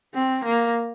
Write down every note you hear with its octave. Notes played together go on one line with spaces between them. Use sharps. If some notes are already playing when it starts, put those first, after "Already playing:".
C4
A#3